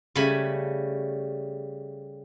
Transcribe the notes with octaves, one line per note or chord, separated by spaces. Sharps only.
C#3 G3 A3 G#5 B5